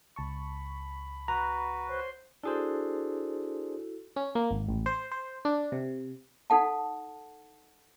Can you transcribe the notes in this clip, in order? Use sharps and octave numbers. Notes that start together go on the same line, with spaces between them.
C#2 A5 B5 C#6
F#4 B4 A#5
C5 C#5 C6
D4 E4 F#4 G#4 A4 C5
C#4
A#3
G#1
A1
C5
C5
D4
C3
D#4 A4 F#5 A5